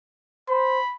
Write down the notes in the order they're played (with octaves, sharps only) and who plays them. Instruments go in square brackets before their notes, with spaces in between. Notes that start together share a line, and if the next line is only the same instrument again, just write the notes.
[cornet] C5 [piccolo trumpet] B5